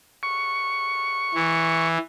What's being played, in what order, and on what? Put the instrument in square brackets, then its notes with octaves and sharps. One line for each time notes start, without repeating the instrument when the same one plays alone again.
[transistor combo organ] C#6
[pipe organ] E3